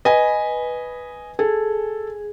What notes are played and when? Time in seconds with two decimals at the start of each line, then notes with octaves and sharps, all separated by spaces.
0.05 B4 D#5 G#5
1.39 G#4 A4